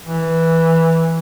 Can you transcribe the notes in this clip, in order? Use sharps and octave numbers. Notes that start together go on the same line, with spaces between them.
E3